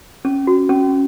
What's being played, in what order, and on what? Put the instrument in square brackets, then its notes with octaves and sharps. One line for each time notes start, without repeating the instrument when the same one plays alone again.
[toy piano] C#4
F#4
C#4